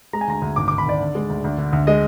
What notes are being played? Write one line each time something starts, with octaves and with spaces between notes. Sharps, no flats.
G#3 A#5
G#5
D2 A#5
D2
G#1 D6
D6
G#1
B5
G#1 D5
D3
G#3
D2
D2
D3
D2
G#3 D#5